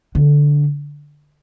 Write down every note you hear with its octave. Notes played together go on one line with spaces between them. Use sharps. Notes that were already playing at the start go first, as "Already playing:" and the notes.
D3